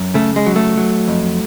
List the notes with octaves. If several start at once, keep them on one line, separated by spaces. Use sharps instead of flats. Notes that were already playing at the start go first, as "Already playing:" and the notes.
Already playing: F#2
C#3 A3
G#3
F#3
A3
F#3
F2